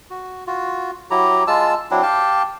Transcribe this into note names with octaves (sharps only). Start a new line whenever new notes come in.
F#4
F4 F#4
F#3 E4 G4 A#5
G#3 F4 A5 E6
F#3 C4 D4 E4
G4 F5 G5 A5